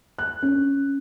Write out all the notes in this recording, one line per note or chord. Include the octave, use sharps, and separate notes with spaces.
F#6
C#4